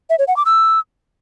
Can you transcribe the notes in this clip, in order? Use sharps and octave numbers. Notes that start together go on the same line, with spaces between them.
E5
C#5
F#5
D6
E6